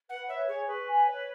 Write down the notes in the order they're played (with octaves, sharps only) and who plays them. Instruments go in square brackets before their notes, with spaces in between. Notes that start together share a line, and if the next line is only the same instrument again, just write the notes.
[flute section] B4 [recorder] F#5
[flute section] C#5 [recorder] E5
[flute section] G#4 [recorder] C#5
[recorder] B4 [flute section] C#6
[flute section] G#5
C#5